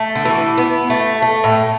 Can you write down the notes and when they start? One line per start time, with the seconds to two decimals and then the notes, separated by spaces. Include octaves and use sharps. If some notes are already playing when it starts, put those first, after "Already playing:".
Already playing: A3
0.15 D3
0.25 E3
0.58 B3
0.90 A3
1.22 A3
1.44 A2